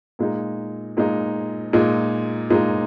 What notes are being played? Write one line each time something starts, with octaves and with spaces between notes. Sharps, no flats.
A#2 G#3 D#4
A#2 G#3 D#4
A#2 G#3 D#4
A#2 G#3 D#4